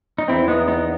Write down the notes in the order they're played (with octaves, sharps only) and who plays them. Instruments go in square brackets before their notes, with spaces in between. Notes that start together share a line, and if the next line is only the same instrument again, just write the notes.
[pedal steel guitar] D#4
[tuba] E2 [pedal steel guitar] C4 E4
[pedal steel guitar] B3 D#4
B3 D#4